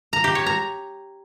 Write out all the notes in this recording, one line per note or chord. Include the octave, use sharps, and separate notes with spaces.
A#5
G4
C#5
A#5